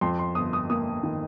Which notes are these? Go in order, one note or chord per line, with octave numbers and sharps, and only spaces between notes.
F2 C6
C6
G1 D#6
D#6
A#3 D#6
D#3